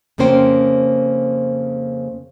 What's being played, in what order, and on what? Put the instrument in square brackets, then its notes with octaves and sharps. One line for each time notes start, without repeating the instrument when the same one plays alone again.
[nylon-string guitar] F2 C#3 A#3 C#4 C5 G5